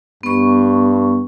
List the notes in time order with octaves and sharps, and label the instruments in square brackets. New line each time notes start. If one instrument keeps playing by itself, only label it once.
[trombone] G2 [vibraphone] B3 C#6